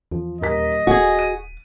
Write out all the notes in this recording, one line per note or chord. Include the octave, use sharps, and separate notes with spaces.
E2 F3
D#1 A#4 D#5 B6
D#1 F#4 G#4 G#5
D#7